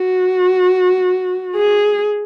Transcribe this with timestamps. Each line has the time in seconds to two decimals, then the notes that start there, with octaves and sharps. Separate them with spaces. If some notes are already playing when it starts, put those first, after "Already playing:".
Already playing: F#4
1.55 G#4